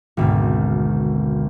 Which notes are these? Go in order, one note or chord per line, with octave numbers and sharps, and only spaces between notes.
G#1 D2 B2